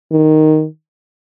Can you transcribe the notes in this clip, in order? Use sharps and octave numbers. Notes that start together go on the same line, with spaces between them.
D#3